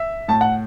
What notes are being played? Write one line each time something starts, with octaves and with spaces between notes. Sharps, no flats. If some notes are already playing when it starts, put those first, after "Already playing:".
Already playing: E5
A2 A5
F#5